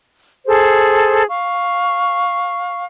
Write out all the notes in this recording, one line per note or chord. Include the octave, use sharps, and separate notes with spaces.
G#4 A4 C5
F5 C#6